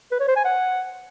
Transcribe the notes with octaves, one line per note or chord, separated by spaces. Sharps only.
B4
C#5
C5
G#5
F#5